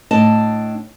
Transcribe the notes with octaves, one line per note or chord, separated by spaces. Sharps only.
A2 D4 D#5 A5